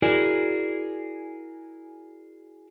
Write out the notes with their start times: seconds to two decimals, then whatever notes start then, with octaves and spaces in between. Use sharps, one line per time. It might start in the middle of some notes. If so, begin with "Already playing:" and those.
0.02 E4 F#4 G#4 A#4 D5